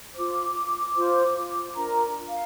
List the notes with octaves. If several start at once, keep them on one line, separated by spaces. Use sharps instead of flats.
F4 C5 D6
F4 C5
D4 F4 A#4 A#5
F5